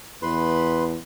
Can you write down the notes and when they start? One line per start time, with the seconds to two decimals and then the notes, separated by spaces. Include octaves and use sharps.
0.22 E2 B4 B5 C6